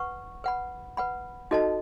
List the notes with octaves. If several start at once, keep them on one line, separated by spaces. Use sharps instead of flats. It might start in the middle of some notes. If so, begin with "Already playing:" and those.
Already playing: B4 F#5 C#6
B4 F#5 B5
B4 F#5 B5
D#4 F#4 A4 D#5 A5